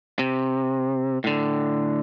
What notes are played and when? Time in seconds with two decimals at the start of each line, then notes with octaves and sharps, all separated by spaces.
0.19 C3
1.24 A2 D3